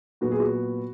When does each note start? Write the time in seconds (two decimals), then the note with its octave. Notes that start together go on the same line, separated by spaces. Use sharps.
0.21 A#2 F#3 B3 F#4
0.31 G#4
0.40 F#4